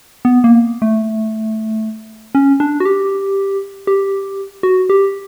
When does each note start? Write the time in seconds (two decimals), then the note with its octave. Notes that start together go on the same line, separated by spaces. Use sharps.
0.25 B3
0.44 A#3
0.82 A3
2.35 C#4
2.60 D4
2.80 F#4
2.85 G4
3.87 G4
4.63 F#4
4.90 G4